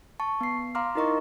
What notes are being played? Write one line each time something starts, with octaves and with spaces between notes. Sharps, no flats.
A5 C#6
B3 C7
F5 A#5 C6 D6 F6
D#4 E4 A#4 D#5 A#5 C#6